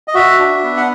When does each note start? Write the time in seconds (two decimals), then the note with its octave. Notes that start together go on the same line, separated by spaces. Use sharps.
0.08 D#5
0.14 F#4 E5
0.39 D4
0.63 B3
0.77 F#5